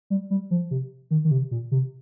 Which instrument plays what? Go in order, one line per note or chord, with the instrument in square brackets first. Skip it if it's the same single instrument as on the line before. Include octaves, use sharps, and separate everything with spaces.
[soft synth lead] G3
G3
F3
C3
D#3
D#3
C3
A#2
C3